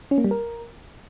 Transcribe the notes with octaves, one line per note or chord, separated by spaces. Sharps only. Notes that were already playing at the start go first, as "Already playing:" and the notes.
C#4
A#3
G3
A#4